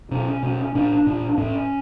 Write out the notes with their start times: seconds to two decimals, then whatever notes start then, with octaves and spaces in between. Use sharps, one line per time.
0.11 B2 C#4
0.43 B2
0.75 A#2 D4
1.07 A#2
1.38 A2 C#4